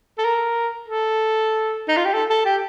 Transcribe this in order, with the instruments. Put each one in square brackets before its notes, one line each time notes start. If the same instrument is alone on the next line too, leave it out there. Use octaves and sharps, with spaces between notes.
[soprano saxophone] A4
A#4
A4
D#4
F4
G4
A4
A4
G4